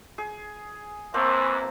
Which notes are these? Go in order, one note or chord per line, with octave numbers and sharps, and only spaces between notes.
G#4
F#2 E3 A#3 C4 A5